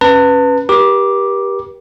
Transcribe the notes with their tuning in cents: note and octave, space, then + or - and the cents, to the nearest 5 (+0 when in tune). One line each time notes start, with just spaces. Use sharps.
C#4 -10 B4 +0 A5 +40
G4 +0 A#4 +45 D6 +0